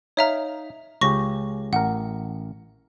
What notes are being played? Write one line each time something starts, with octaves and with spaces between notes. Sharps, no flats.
D#4 C#5 E5 F5 A#5
C#2 C#3 G4 C#6 A#6
A1 A#4 F#5